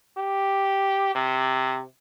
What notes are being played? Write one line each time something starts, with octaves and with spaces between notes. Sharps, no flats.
G4
C3